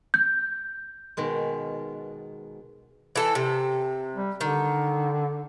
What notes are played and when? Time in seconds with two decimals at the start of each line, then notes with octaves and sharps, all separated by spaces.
0.14 G6
1.17 B2 D#3 G#3
3.16 E3 A4
3.35 C3
4.15 G3
4.41 D3 D#3